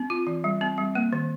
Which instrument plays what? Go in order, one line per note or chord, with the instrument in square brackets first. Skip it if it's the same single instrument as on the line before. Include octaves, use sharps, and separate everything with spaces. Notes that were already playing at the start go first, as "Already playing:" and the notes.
Already playing: [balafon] C4
F4
E3
G3
C4
G3
A#3
D#3